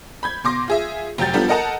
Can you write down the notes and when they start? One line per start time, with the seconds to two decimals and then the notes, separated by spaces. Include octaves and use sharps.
0.23 B5 G6 G#6
0.44 B2 C6 D6 A#6
0.68 F4 G#4 E5
1.18 F1 F#3 G4 G6 A6
1.33 F3 G3 B3 D4 F4 A4
1.48 A4 A#4 D#5 F#5 A5 A#5